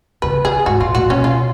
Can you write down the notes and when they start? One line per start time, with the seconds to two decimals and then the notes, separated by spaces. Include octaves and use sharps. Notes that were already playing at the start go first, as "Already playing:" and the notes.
0.22 C#3 B4
0.44 D#3 G#4
0.66 G#2 F#4
0.81 A#2 F4
0.95 A#2 F#4
1.10 B2 C#4
1.24 F4